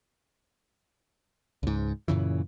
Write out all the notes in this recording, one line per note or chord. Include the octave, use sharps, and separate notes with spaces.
C#2 G#2
F#2 A#2 C#3 E3